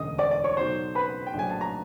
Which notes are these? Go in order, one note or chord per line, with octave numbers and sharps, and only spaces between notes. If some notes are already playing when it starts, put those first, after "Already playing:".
Already playing: E1 D2 C#3 D#5 D#6
D5 D6
D5 D6
C#5 C#6
B1 B2 F#3 C5 C6
B4 B5
G5
A#1 A2 F#3 G#5
A5
A#5